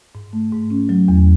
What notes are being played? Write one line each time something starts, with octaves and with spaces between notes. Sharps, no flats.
G#2
A3
G#2
C#4
F#3
E2